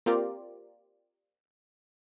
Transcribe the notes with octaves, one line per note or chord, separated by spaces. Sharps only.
A#3 C4 F4 G4 A#4 D5